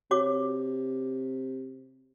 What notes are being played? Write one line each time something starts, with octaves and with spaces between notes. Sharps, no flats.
C3 F#4 C#5 D6